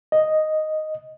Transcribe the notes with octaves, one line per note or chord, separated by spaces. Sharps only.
D#5